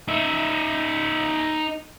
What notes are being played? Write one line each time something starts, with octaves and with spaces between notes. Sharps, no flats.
D#4 E5